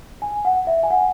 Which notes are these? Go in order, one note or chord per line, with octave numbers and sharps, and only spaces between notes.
G#5
F#5
E5
G#5
F#5